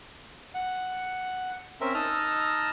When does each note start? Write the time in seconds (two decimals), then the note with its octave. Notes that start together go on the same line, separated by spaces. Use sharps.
0.54 F#5
1.81 C4 C#4 A#4 E5
1.94 D#4 D#5 A5 A#5 E6 F6